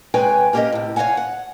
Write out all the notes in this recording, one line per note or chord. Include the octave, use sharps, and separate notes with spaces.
C3 G#3 B4 C#5 G5 G#5
A#3 C#4 G4 A4 A#4 D#5
A2 C3
C#5 D#5 F5 F#5 G#5
F#5